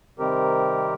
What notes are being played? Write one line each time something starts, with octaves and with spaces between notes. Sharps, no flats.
C3 D#3 G3 C4 G4 A#4